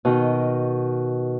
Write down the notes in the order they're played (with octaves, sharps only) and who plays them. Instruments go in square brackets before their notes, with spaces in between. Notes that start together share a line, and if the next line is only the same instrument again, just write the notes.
[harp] B2 D#3